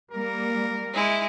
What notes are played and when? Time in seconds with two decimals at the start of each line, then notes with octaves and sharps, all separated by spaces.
0.11 G3 A#3 A#4
0.94 G#3 E4